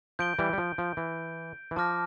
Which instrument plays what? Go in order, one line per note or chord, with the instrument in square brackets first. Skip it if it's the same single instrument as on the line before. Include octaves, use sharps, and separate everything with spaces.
[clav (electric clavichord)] F3 [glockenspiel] G6 D7 G7
[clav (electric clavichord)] E3 G3
G3
F3
F3
E3
E3
[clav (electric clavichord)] F3 [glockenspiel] A5 D6 F6 A#6